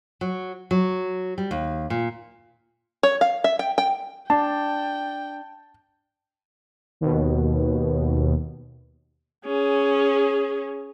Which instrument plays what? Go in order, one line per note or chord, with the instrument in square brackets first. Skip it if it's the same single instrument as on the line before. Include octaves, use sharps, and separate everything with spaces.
[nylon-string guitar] F#3
F#3
G3
D#2
A#2
[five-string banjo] C#5
F5
E5
G5
G5
[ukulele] D4 [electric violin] G5 [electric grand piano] A5
[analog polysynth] D#2 B2
[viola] C#4 G#4